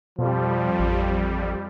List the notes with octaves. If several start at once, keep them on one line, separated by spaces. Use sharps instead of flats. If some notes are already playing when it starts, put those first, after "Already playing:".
F2 B2 F3 G3
A1